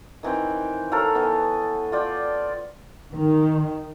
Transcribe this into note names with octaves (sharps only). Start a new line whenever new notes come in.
D#3 E3 C4 G5
A4 A#4 C#5 F5
E3 B3
F4 D5 G5
D#3